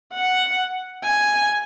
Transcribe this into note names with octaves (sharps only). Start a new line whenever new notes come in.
F#5
G#5